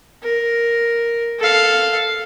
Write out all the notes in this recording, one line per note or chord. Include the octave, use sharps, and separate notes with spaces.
A#4
A4 F5